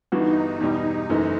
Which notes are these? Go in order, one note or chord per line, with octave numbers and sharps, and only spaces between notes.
G1 G2 E3 B3 D#4 F#4
E2 B2 G3
F#1 F#2 E3 A3